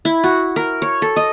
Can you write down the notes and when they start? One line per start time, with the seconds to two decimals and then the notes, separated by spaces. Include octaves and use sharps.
0.05 E4
0.24 F#4
0.56 A#4
0.82 C#5
1.02 A4
1.16 D#5